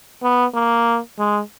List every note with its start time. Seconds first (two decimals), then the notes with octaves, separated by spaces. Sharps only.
0.23 B3
0.55 A#3
1.19 G#3